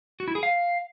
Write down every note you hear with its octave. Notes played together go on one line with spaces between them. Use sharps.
F#4
E4
G#4
F5